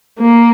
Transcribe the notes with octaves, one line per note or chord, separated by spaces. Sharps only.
A#3